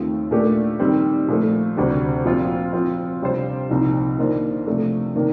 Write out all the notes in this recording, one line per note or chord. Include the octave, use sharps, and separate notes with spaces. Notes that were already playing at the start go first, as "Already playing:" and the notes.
Already playing: D#2 D#3 A3 C4 F4
A#2 A3 D4 G4 A#4
D#3 G3 C4
A#2 F3 A3
D2 C3 G3 D4
A#2 F3 C4 F4
F3 C4 F4
C3 G3 D4 F4 C5
C2 A#2 F3 C4 D#4
D#3 A#3 D4 F4 C5
C3 F3 A3 D4
C3 D#3 A#3 D4